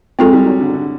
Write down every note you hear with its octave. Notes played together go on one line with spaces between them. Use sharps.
G#3 C4 F4 A4
G3
F#3
D3
D3